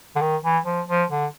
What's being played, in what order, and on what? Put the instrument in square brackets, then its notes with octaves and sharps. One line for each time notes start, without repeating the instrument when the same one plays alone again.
[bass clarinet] D3
D#3
E3
F3
F3
D3